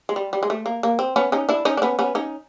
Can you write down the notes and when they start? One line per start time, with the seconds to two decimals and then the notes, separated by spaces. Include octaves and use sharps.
0.09 G#3
0.16 G3
0.33 G3
0.43 G#3
0.50 A3
0.66 A#3
0.83 A#3
0.99 C4
1.16 B3 C#4
1.32 C#4 D#4
1.49 D4 E4
1.65 C#4 D#4
1.77 D4
1.82 B3 C#4
1.99 B3 C#4
2.15 C#4 D#4